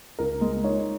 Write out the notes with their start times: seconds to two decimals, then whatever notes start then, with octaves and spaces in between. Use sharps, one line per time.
0.19 C#2 A#4
0.41 G#3
0.63 D#4 C#5